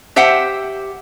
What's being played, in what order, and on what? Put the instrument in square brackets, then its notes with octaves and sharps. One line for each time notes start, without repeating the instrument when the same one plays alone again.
[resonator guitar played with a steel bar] G4 C5 E5 F#5 G5